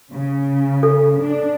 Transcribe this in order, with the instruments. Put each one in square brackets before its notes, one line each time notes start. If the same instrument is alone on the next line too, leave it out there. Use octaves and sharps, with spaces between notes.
[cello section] C#3
[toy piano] A4
[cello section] D4